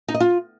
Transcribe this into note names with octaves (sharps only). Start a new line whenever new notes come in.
D#4
D#5
F4